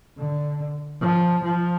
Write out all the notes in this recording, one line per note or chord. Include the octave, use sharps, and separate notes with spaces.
D3
F3
F3